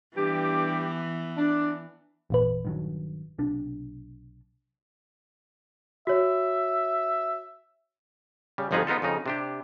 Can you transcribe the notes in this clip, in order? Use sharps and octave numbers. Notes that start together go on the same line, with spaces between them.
G2 E3 B3 G4
D4
G#1 E2 A#2 B4
G2 D#3 F#3
B1 C3 D4
F#4 C#5 E5
C#3 G3
G1 F2 F3 D#4 G#4 B4
B3 D#4 F4 A4
F2 C#3 D#4
C3 D4 G4